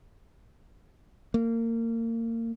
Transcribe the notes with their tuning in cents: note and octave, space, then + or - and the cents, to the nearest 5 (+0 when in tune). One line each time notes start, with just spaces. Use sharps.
A#3 -30